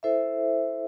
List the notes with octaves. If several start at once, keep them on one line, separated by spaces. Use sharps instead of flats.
E4 A4 C5 E5